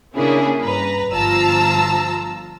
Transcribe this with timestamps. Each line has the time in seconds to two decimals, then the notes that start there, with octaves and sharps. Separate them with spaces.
0.14 C#3 A#3 C#4 D4 E4 G#4
0.60 G2 B4 A#5
1.11 G1 F3 F4 A5 A#5 E6